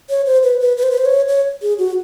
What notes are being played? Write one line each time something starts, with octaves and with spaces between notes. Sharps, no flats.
C#5
C5
B4
B4
B4
C5
B4
C5
C#5
C#5
G#4
F#4